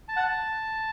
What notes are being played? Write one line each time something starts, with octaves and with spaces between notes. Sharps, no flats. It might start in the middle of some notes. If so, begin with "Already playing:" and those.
A5
F#5
A5